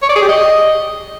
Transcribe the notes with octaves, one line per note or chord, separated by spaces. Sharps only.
C#5
D5
G#4
G4
D#5